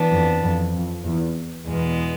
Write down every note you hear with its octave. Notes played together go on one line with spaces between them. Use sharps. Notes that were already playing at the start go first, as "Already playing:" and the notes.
Already playing: E3 B3 D4
F2
F2
F2
E2
E2 B2 G#3 B3